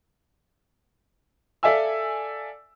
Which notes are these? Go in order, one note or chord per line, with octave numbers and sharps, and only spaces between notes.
A4 D5 E5 F5 G#5 E6